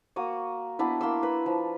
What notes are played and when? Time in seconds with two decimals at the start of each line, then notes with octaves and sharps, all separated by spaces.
0.16 A#3 F#4 C#6 D#6
0.79 B3 D4 E4 B4
1.01 A#3 C6 E6
1.23 B4
1.46 F3